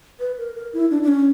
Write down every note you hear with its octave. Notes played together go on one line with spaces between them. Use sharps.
B4
A#4
A#4
E4
D4
D4
C#4